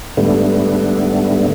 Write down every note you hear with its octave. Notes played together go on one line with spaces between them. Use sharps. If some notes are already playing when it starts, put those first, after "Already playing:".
G#2 D3 G3 A3 B3